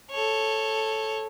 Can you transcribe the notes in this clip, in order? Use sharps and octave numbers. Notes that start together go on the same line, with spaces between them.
A4 C#5